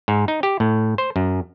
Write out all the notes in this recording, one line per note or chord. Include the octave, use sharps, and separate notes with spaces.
G#2
D#4
G4
A2
C5
F#2